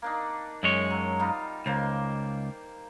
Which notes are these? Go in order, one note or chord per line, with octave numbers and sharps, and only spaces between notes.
A#3 D4 D#4
F#2 G#3 C#5
F#3
G3 D#4 F4
C#2 A#3 C5